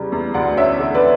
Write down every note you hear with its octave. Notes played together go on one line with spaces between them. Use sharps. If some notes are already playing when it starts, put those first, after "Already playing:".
Already playing: E2 C#3 G3
E2
D2 D5 F#5
C#4 C#5 E5
D3
B4 D5